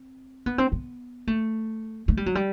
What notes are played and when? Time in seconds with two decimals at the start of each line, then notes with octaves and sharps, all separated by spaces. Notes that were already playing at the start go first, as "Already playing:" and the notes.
Already playing: C4
0.46 B3
0.58 C4
0.72 B3
1.27 A3
2.08 A3
2.17 G3
2.26 F#3
2.35 G3